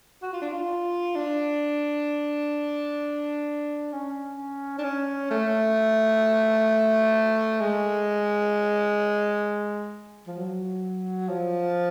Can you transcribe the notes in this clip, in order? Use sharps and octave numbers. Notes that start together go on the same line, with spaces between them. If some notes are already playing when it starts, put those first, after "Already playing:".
F#4
F4
D4
F4
D4
C#4
D4
C#4
A3
G#3
F3
F#3
F3